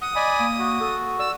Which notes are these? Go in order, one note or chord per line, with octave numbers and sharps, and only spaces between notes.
F#5 D#6
D5 D#5 G#5 B5
A#3
F#4
A4
D5 E6